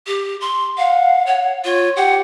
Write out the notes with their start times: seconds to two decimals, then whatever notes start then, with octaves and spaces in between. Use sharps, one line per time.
0.07 G4
0.41 C6
0.78 F5 F#5
1.26 C#5
1.64 F4 C#5
1.96 G4 F#5